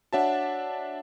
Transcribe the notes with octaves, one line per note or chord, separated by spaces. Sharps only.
D4 F#4 C#5 E5 F#5 A5